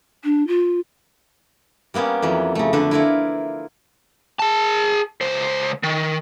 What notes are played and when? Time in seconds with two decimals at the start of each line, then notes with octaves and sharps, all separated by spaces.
0.24 D4
0.47 F4
1.94 G3 A#3 B3 C#4 D5
2.22 F2 E3 F#3 G4
2.55 C#3 A3
2.73 D3 A3 D4 A4 B4
2.91 E4 F4 A#4 B4 C#5 D5
4.39 G#4 A5
5.21 C#2 C5
5.84 D#3